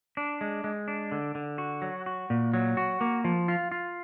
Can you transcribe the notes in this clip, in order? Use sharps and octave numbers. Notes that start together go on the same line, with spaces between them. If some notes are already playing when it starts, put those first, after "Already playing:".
D4
G#3
G#3
D4
D3
D3
F#4
F#3
F#4
A#2
F#3
F#4
A#3
F3
F4
F4